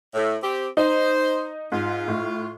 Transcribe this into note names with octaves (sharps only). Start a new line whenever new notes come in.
A2
C4 G4
D#4 C5
G#2 F4
A2